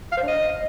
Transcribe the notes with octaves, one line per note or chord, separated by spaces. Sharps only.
F5
C5
D4
D#5